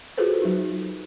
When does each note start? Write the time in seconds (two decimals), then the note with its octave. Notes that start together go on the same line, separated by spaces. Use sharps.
0.17 F4 F#4 G#4 A4 B4 C5
0.42 F#3 D#4